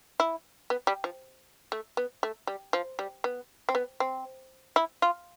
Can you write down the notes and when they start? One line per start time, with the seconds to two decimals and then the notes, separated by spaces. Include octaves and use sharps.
0.20 E4
0.70 B3
0.87 G3
1.04 F3
1.72 A3
1.97 B3
2.23 A3
2.47 G3
2.73 F3
2.99 G3
3.24 B3
3.69 C4
3.75 B3
4.00 C4
4.76 E4
5.02 F4